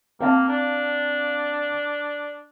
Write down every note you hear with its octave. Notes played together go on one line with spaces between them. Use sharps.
A#3 C4 F5 A5
D4